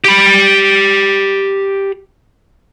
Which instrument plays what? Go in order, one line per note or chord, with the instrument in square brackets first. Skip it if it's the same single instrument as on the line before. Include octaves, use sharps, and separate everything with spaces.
[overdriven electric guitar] G4 B5